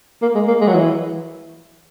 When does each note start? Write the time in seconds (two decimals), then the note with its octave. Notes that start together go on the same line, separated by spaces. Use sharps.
0.22 A#3
0.35 G#3
0.48 A#3
0.61 G#3
0.68 F#3
0.75 E3